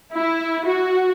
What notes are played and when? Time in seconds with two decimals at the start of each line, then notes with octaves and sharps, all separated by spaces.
0.14 E4
0.67 F#4